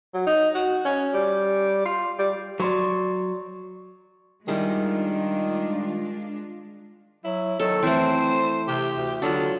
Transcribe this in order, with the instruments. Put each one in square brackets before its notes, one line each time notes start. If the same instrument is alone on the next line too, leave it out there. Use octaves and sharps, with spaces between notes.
[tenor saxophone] F#3
D#4
F#4
C#4
G3
F4
G3
[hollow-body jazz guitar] F#3 [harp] D5 C6 C#6
[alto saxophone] D#3 [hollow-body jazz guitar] G3 E4 G#4 [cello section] G#3 D4 F4
[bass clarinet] F#3 [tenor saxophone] E4
[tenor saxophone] D#3 [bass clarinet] F#3 [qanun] A4
[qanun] E3 A3 [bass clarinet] C4 [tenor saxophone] C5
[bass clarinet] C3 [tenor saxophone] G4
[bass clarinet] D2
[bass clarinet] D3 [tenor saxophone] F#3 [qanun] D4 F4